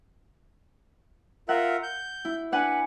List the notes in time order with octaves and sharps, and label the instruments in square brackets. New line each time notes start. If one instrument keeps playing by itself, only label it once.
[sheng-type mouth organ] F4 A#4 E5 [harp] F#5
[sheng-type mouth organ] G6
[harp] E4
[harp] D4 F#5 G#5 [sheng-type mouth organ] B4